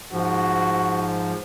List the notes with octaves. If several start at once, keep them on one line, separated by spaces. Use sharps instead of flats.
G#2 F3 F#4